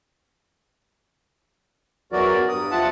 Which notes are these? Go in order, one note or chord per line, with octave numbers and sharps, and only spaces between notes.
E2 E3 F#3 F#4 A#4 D5
G2 D#6
E2 F3 F4 E5 F#5 A5